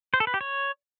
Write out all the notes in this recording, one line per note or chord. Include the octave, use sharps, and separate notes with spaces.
C5
A4
B4
G4
C#5